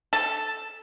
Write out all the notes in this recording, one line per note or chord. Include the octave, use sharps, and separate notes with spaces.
A4